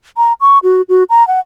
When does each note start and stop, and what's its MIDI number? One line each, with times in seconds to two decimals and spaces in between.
0.17 0.33 82
0.41 0.59 85
0.63 0.82 66
0.89 1.04 66
1.10 1.26 82
1.28 1.40 78